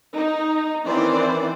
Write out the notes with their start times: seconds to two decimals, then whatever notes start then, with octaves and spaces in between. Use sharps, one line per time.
0.16 D#4
0.85 D#3 E3 C4 C#4 C5 D5